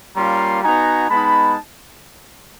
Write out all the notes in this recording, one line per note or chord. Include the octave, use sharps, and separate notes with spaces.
G3 A#3 C#4 F4 A#5 C6
B3 D#4 F#4 G#5 A#5
G#3 B3 D#4 A5 B5